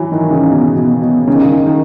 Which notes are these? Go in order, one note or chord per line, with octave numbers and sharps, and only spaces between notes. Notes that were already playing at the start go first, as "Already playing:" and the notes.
Already playing: E3 F#3
D#3
C#3
B2
B2
B2
C#3
D#3
C#3
D#3